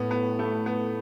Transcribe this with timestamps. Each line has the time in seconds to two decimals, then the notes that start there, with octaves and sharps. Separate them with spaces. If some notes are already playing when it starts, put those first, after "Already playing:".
Already playing: A2 B3
0.11 B3
0.39 A3
0.66 B3